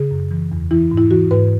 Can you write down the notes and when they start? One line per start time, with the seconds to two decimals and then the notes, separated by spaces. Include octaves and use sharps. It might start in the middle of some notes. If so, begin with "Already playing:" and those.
Already playing: C#3 G#4
0.11 F#2
0.31 E3
0.52 E2
0.71 E3 E4
0.91 G#2
0.98 E4
1.10 E3 F#4
1.31 G#2 B4